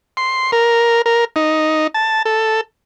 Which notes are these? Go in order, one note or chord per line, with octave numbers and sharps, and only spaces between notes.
C6
A#4
A#4
D#4
A5
A4